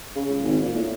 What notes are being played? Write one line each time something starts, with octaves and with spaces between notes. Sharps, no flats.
C#3
C#2
G#1
A#2
A2